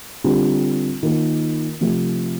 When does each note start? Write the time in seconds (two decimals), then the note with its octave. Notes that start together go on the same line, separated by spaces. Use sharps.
0.24 D3 G3 C4 F4
1.03 D#3 A#3 F4
1.81 C3 F3 A3